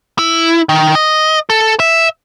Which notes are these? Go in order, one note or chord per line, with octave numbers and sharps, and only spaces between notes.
E4
D#3
D#5
A4
E5